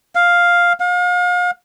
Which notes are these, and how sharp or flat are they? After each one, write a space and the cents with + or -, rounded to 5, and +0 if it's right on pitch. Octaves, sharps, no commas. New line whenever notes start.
F5 +5
F5 +40